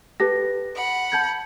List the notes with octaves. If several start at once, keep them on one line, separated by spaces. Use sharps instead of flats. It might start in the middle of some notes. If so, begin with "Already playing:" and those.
G4 A4 B4 A#6
F#5 B5
A5 G6 G#6